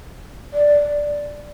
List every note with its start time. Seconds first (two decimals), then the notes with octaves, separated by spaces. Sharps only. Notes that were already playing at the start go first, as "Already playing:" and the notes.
0.53 D5